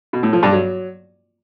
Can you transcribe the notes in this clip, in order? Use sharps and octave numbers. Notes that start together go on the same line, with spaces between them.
B2
A2
F3
G2
F#3